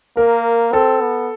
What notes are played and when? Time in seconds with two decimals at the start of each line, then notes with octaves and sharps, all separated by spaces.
0.17 A#3 A#4
0.72 C4 A4
1.01 B3